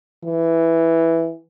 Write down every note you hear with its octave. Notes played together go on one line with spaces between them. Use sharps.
E3